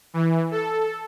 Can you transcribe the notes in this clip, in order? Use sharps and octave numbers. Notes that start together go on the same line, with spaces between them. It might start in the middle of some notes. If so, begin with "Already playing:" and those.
E3
A4